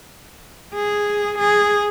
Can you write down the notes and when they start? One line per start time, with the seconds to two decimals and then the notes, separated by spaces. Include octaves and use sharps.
0.74 G#4
1.38 G#4